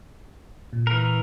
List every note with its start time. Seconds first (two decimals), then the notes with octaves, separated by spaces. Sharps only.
0.73 A#2
0.87 E3 A#4